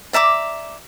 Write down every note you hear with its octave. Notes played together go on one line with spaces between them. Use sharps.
D5 E5 A#5 D6